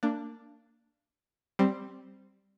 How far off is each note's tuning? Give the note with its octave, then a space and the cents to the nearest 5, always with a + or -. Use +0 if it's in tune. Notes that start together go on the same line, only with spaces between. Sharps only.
A#3 -25 D4 +0
G3 +0 C4 +0